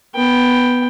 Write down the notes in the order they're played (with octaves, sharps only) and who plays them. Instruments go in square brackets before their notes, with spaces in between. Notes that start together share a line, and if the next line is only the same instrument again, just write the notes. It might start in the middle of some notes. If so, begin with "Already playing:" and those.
[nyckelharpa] B3 G5